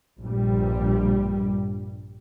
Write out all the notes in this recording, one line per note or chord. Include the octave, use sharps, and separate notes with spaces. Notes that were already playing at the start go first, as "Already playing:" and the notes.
A#1 G2 G3